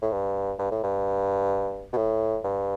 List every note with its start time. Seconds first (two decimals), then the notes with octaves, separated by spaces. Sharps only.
0.02 A2
0.12 G2
0.59 G2
0.71 A2
0.84 G2
1.93 B2
1.97 A2
2.44 G2